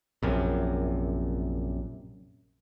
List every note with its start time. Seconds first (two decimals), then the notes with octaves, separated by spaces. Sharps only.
0.23 A#1 F#2 C3